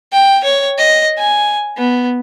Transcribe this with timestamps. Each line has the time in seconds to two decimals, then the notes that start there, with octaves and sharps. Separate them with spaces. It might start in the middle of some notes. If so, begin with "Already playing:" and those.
0.12 G5
0.44 C#5
0.78 D#5
1.18 G#5
1.77 B3